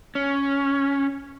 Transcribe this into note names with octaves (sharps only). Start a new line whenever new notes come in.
C#4